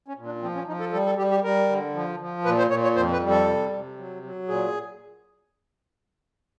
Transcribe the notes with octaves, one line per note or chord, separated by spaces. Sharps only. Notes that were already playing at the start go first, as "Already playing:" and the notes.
C#4
A#2
D4
F3 C4
C#4
F3 D#4
A4
G3 A4
A4
G3 G4
G4
G3 A#4
D3
F3
F3
A#2 B4
C5
A#2 C#5
C#5
F2 C5
B4
G3
A4
C3
C3
F#3
F#3
A#2 G#4